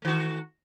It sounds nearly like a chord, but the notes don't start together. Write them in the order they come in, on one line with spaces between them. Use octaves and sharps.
A3 D#3 F#4